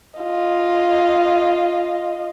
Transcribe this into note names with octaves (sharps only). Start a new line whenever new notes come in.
F4 D#5